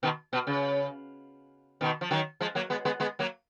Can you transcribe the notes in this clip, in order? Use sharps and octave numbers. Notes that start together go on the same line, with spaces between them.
B2 D#3
B2
C#3
B2 D#3
F3
D#3 F#3
F3 G#3
F#3 A#3
G#3 B3
G#3 B3
G#3 B3
F#3 A#3